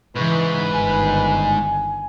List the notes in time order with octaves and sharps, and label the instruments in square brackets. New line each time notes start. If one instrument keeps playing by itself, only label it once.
[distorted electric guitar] G#2 [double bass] C#3 E3 [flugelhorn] B4 [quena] C#6
[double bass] G1 D#3 [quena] G#5